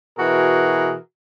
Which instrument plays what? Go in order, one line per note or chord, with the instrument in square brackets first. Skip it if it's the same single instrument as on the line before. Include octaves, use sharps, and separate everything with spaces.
[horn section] B2 E3 F#4 G#4 A#4